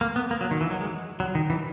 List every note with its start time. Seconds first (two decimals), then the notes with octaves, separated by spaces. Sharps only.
0.01 A#3
0.16 B3
0.31 A#3
0.41 F#3
0.51 D#3
0.61 E3
0.71 F#3
0.81 G#3
1.20 F#3
1.35 D#3
1.50 E3